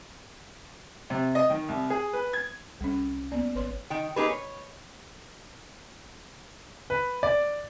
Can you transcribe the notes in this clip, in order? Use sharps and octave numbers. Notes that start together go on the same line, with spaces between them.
C3
D#5
D#3
C2
G#4
B4
G#6
C2 G3 C#4
A#3 B3 D5
G#1 B4 C#5 C6
D#3 G5
A#3 D#4 G4 G#4 B4
C#5
B4
D5